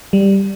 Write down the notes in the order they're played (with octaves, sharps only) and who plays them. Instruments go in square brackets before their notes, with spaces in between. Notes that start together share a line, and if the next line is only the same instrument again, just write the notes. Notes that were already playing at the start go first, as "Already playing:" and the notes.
[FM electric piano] G3